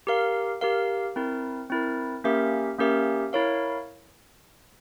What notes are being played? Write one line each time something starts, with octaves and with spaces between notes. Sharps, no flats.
G4 A#4 F5
G4 A#4 F5
C4 E4 A#4
C4 E4 A#4
A#3 C#4 G4 A#4 E5
A#3 C#4 G4 A#4 E5
E4 A#4 C#5 F5